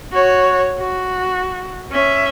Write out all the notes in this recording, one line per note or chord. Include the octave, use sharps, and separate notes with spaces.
F#4 C#5
F#4
C#4 E5